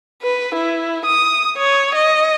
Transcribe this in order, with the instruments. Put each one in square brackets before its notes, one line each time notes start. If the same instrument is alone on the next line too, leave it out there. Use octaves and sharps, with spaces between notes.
[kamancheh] B4
E4
D#6
C#5
D#5